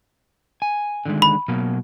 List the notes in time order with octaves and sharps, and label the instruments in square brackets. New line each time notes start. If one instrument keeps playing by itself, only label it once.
[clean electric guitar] G#5
D3 D#3 G#3
[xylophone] B5
[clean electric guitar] B2 F#3 A#3